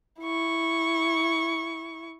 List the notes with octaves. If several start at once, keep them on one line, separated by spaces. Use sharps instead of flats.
E4 C#6